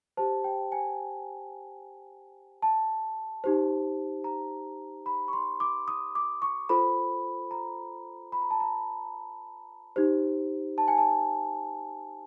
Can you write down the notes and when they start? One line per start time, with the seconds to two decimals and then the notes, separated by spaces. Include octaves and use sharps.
0.17 G4 C5 A5
0.44 G5
0.72 G#5
2.62 A5
3.44 D#4 G4 C5
4.24 A#5
5.06 B5
5.28 C#6
5.33 C6
5.60 D6
5.88 D#6
6.15 D6
6.42 C#6
6.69 F4 A4 C5 B5
7.51 A#5
8.32 B5
8.42 A#5
8.51 A5
8.60 A#5
9.96 D#4 G4 C5
10.78 A5
10.88 G#5
10.98 A5